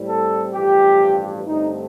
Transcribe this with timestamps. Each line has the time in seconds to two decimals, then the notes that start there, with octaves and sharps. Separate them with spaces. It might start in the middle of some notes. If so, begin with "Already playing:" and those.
Already playing: A2 G3 C4
0.08 A4
0.53 A1 G2 F3 G4
1.46 G2 D3 A3 C4 D#4